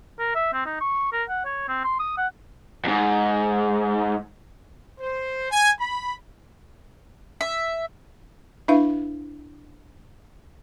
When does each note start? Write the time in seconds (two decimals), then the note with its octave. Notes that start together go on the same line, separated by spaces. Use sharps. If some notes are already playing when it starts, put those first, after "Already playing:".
0.19 A#4
0.35 E5
0.53 C4
0.66 D#4
0.81 C#6
1.13 A#4
1.29 F#5
1.45 C#5
1.69 C4
1.84 C6
1.99 D#6
2.18 F#5
2.85 F2 G#2
5.01 C5
5.51 G#5
5.80 B5
7.41 E5
8.68 D4 E4 B4 E5 F5